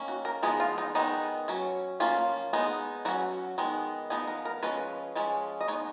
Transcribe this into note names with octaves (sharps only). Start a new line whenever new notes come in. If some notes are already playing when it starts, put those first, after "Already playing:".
Already playing: D#3 A#3 C#4
F#4
A#4
F3 G#3 B3 D#4 G#4
F4
D#4
D#3 G#3 B3 D#4
F#3 C#4
F3 A#3 C#4 F4
G#3 B3 D#4
F#3 C#4 F#4
D#3 G#3 B3
F3 B3 D#4 G#4
A#4
A#4
F3 G#3 C#4 B4
F3 G#3 C#4
D#5
G#3 B3 D#4 C#5